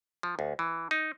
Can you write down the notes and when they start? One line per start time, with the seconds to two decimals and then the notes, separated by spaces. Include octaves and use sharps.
0.23 F3
0.39 D2
0.59 E3
0.91 D#4